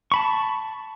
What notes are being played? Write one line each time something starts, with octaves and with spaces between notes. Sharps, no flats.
A5 B5 C#6